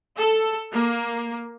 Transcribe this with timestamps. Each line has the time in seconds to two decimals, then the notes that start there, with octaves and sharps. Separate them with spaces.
0.17 A4
0.72 A#3